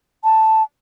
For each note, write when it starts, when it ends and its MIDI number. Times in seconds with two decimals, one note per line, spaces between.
0.24 0.63 81